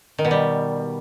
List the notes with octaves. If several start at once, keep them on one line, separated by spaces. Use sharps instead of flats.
D#3
B2
G3